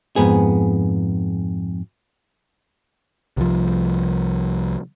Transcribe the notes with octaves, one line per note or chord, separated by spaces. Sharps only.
F2 G#2 B3 G#4
C2 F3